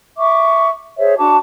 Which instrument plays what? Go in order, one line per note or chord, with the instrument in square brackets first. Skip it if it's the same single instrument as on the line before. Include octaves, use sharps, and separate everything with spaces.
[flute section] E5 C#6 D6
G#4 C5 C#5 E5
D4 F#4 A5 D6